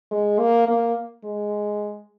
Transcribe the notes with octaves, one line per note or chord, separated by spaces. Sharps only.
G#3
A#3
A#3
G#3